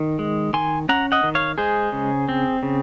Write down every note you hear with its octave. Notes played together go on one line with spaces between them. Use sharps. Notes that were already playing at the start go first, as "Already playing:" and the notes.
Already playing: D#3
G#3
D#3 G#5 C6
C#4 F#5 A#5
D#5 F#5
D#3
C#5 F5
G#3 G#4 C5
C#3
C4
C#3